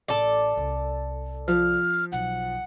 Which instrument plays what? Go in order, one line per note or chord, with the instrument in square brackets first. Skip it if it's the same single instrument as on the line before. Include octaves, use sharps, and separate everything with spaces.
[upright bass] A1 [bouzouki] A4 D5
[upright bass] C2
[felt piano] F3 [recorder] F6
[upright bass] B1 [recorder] F#5